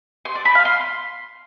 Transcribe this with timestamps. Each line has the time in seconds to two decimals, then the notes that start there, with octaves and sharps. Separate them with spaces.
0.25 C6
0.35 D5
0.45 B5
0.55 F5
0.65 C6